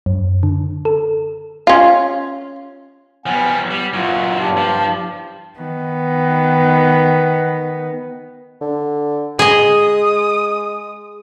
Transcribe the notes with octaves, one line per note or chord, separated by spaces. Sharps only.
F#2
D3
A4
C#4 F4
F3 G3 B3 F#5 G#5
G3 B3
F#2 A#2 F4 F#5
G2 D4 G4
F3
D#3 B3
D3
G#3 G#4 D#5 D#6